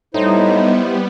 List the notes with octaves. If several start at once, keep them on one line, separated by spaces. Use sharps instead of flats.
A2 G3 B3 D#4 E4 C5